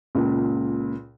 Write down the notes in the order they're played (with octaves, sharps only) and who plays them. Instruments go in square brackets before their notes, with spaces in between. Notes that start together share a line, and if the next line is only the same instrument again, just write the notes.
[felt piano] C#2 A#2